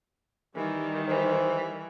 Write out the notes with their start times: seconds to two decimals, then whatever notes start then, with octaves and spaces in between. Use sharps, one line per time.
0.55 D#3 E3 G3
1.08 E3 C5